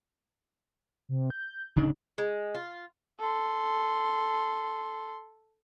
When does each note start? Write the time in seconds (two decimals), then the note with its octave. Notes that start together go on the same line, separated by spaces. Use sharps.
1.09 C3
1.30 G6
1.76 D1 C#3 D4 D#4
2.18 G#3
2.54 F4
3.19 A4 C6